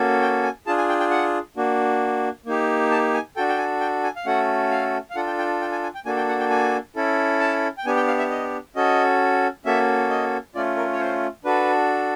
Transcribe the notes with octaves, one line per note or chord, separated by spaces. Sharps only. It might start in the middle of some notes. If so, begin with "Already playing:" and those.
Already playing: A#3 C#4 F#4 A4
G5
G#5
D4 F4 G#4 A5
G#5
G5
G5
F#5
A#3 D4 F#4
A#3 D#4 G4
A5
G#5
D4 F#4 A4 G5
G5
G#5
G5
G#5
F5
A3 C#4 F#4 A4 F#5
F5
F5
D4 F4 A4 F#5
G5
G5
G5
G#5
G#5
G5
A#3 D4 F#4 A4 G#5
G5
F#5
G5
G#5
C#4 E4 A4
A5
G5
B3 D4 G4 G#5
G5
F5
E5
D#5
C#4 F#4 A4 D#5
A#3 C#4 F#4 A4 E5
D#5
A3 C#4 F4 D5
A#4
C#5
C5
D4 F#4 A4 B4